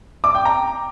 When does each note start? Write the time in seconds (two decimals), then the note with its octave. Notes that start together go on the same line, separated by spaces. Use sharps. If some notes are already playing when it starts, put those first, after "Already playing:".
0.24 D6
0.35 G5
0.45 A#5